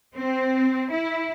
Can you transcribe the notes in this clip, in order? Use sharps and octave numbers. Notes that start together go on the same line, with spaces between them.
C4
E4